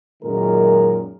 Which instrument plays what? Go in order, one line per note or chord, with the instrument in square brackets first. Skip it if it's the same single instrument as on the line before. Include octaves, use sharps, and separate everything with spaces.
[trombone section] F#2 A#2 D#3 G#3 A#4